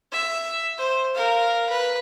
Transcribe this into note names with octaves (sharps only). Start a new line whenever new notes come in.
E5
C5
A#4 F5
B4